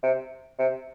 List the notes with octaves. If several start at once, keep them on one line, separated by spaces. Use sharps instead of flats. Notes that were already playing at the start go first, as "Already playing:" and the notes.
C3
C3